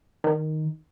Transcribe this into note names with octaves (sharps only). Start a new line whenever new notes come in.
D#3